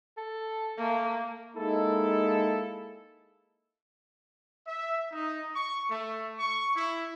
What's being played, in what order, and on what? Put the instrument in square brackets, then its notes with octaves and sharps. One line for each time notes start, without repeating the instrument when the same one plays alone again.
[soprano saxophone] A4
[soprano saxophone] A3 [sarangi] A#3
[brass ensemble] G#3 A#3 D#4 E4 A4
[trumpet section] E5
D#4
C#6
A3
C#6
E4